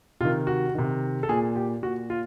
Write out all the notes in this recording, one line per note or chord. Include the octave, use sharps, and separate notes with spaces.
C3 D#3 F4
F#4
C3 D#3
A4
A#2 G#4
G4
A#2 F#4
F4